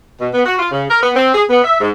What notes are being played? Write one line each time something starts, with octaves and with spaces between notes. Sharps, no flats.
B2
B3
F#4
F4
C#3
A#4
B3
C4
G#4
B3
E5
G#2